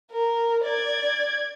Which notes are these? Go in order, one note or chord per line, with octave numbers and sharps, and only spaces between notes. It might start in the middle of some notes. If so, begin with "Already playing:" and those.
A#4
D5 G#6